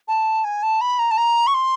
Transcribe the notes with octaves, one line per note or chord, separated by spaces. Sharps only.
A5
G#5
A5
B5
A#5
A5
A#5
C#6
C6